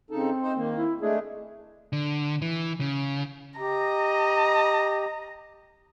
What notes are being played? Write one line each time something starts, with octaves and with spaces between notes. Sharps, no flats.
C#3 C4 D#4 A4
D#4 C5
D#3 A#3
E4
G#3 A3 D4 G#4
D3
E3
C#3
G4 D#5 A#5